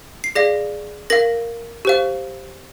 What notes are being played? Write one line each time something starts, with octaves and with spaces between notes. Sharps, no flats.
C7
G#4 D5 F5 A#6
A#4 F5 A#6
G4 C5 F5